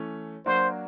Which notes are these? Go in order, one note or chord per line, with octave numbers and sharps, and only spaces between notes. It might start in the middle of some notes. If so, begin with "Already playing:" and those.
Already playing: E3 A3 C#4
F#3 A#3 D4 F#4 C5